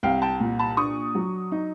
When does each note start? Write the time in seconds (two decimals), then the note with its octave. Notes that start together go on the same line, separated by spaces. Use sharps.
0.03 C2 F5 G5
0.22 G5 A5
0.40 A#2
0.59 A5 B5
0.77 D4 C#6 D#6
1.15 F#3
1.52 D#4